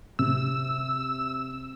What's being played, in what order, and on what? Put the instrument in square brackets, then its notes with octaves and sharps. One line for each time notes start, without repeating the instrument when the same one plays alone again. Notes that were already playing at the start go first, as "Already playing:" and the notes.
[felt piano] C3 [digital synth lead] E6